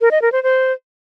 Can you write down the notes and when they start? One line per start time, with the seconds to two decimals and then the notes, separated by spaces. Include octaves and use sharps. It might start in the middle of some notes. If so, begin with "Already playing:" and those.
0.01 A#4
0.11 D#5
0.22 A#4
0.32 C5
0.43 C5